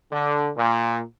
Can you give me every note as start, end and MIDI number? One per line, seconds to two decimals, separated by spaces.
0.12 0.50 50
0.56 1.02 46